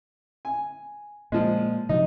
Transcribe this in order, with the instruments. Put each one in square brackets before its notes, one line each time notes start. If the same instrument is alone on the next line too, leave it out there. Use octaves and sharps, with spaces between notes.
[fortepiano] G#5
[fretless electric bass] A#2 [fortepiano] F3 G#3
[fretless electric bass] C3 F3 F#3 [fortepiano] D#4